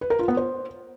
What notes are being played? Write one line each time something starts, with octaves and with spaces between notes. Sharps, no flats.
B4
A#4
F4
B3
C5